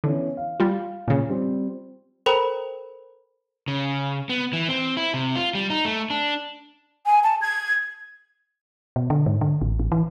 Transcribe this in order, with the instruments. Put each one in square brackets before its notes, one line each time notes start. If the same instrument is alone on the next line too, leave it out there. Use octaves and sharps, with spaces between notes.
[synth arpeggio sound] D3 [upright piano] E3 B3 C#4
[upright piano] F5
[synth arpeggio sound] G3 F4
A#2 C#3
[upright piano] F3 G3 C4
[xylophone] A4 A#4 C5 G5 A#5 B5
[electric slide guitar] C#3
B3
E3
C4
E4
C3
F4
G3
D#4
A3
D4
[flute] G#5
A5
G#6
[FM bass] B2
D3
G#2
D3
A1
A1
E3